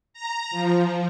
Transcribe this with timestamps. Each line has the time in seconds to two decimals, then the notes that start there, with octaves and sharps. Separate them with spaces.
0.13 A#5
0.51 F3